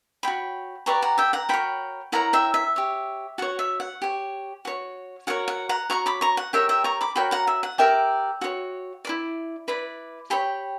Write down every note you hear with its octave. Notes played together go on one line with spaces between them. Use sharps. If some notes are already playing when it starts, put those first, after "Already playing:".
F#4 C#5 G5 B5
G4 B4 D5 A#5 C#6
F#5 A#5
E5 G5
F#5 A#5
F#4 A#4 C#5 G5 B5
E4 A#4 C#5 F#5 A#5
E5 G5
E5
G4 C#5
F#4 C#5 F#5
E5
F#5
G4 C#5
F#4 C#5
F#4 A#4 C#5 F#5
F#5
F#5 A#5
F#4 C#5 A#5 C#6
B5 D6
A#5 C#6
F#5
G4 A#4 C#5 E5 G5
E5 G5
A#5 C#6
B5 D6
F#4 A#4 C#5 G5 B5
F#5 A#5
E5
F#5
G4 A#4 D5 E5 G5
F#4 A#4 C#5
E4 B4 D5
E4 B4 D5
G4 C#5 G5 B5